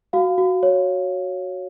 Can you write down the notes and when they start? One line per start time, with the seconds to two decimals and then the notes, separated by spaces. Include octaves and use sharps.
0.13 F#4 F5
0.38 F#4
0.63 C#5